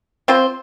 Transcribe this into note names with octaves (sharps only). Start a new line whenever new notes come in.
C4 F4 C5